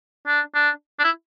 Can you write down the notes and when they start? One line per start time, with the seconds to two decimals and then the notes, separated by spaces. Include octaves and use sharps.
0.26 D4
0.54 D4
0.99 D4
1.04 E4